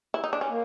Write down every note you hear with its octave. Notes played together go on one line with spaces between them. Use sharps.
E4
D#4
D4
C#4
A#3